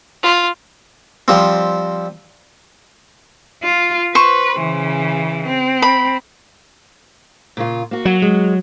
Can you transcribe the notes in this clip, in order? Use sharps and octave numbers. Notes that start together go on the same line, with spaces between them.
F4
F3 G3 C4
F4
B4 C5 C#6
C#3 E3
C4
B5
A#2 C#3 F4
A#3 F#4
F#3
G#3